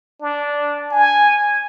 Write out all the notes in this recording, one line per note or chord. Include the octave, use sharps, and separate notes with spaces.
D4
G#5